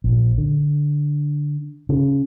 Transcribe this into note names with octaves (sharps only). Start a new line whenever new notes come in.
A#1
D3
C#3